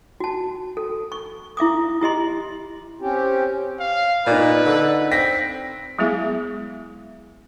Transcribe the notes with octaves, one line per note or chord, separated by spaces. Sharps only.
F#4 A5
A4
C#6
E4 E5 D6 D#6
E4 G4 D#5 C6
C4 C#4 G4
F5
A#2 D#4 B4 D5
D3
C4 A#6 B6
F#3 G#3 B3 E4 G#4 E5